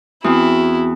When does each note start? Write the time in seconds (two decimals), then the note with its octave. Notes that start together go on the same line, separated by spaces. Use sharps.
0.24 E2 C4 E4 F#4